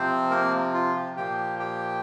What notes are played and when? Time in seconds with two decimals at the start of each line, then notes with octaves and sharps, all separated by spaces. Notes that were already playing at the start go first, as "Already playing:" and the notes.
Already playing: C3 F3 C4 C5
0.30 A#3 A#4
0.74 F4
0.96 G4
1.17 A#2 F3 A#3 G4 G5
1.59 G4 G5